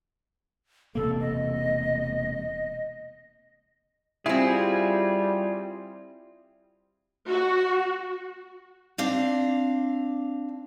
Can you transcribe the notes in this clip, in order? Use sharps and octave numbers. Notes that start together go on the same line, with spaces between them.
E1 C3 A#3 A4
D#5
G3 C4 E4 F4 G#4
F#4
C4 D4 F5